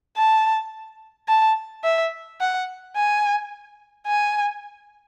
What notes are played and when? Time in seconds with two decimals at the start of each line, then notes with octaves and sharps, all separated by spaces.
0.17 A5
1.28 A5
1.84 E5
2.41 F#5
2.96 G#5
4.07 G#5